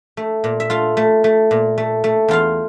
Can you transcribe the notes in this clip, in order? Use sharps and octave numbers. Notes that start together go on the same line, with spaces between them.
A3
A#2
E5
A3 F4 F5
A3
A3
A#2
A3
A3
E2 F4 F5